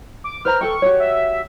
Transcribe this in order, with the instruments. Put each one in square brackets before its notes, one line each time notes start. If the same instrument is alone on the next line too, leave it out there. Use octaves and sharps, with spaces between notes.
[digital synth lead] D6
[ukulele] B4 C5 A#5 [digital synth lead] F6
[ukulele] A4 G5 [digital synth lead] C#6
[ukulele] F#4 G4 C#5
[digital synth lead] E5